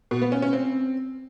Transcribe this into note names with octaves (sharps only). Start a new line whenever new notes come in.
B2
B3
C#4
C#4
C4